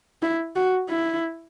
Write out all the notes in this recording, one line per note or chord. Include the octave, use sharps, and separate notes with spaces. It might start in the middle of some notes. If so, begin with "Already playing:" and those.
E4
F#4
E4